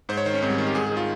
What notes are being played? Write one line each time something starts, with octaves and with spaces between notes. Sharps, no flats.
G#2 C5
C#5
D#3 C5
C#4
G#2 C4
G3
D#3
G4
G#2 G#4
G#4
D#3
F4